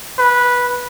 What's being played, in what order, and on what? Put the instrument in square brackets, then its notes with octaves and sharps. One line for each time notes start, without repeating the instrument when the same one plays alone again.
[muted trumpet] B4